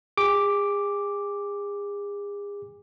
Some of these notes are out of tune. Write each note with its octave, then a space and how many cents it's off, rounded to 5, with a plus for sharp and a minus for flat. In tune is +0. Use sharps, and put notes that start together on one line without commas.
G#4 -35 D6 +0